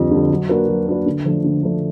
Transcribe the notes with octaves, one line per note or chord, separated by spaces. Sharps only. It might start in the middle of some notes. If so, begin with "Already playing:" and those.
Already playing: F2 D3 G3
D3 G3
F#3
A#3 D4 F#4 B4
F#3
A#3 D4 F#4 B4
D3
F3 A3 D4
D3
F3 A3 D4